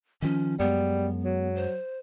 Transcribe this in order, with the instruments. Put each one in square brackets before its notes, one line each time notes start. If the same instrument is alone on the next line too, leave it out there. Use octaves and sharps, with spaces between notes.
[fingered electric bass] D#3 F3 [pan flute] C#4
[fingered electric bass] F#2 G#3 [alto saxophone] G3 [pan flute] B3
[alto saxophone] F#3
[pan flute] C5